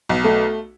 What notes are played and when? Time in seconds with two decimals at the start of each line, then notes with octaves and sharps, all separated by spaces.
0.09 B1
0.24 A3